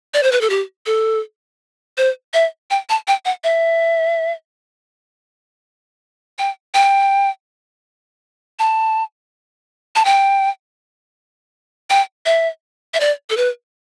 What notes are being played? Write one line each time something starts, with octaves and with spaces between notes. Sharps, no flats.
D5
C5
B4
A4
G4
A4
C5
E5
G5
A5
G5
F#5
E5
G5
G5
A5
A5
G5
G5
E5
E5
D5
A4
B4